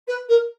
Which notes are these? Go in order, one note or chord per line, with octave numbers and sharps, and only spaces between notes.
B4
A#4